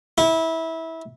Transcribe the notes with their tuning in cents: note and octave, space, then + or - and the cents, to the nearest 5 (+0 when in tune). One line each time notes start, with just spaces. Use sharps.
E4 -20